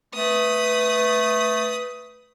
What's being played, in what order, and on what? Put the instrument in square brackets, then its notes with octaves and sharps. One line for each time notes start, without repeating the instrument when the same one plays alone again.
[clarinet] A3 [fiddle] B4 D#6